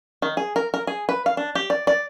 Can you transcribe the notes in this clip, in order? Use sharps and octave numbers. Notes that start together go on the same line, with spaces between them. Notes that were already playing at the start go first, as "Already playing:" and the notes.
D#3
G#4
A#4
A#4
G#4
B4
F5
D4
G4
D5
D5